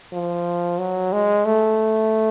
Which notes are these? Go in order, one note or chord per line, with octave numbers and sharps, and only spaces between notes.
F3
F#3
G#3
A3